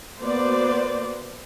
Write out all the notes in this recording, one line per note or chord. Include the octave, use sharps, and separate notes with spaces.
A#3 B3 F#4 C5 D5